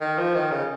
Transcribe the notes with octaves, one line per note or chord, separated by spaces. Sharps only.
D#3
F3
D#3
C#3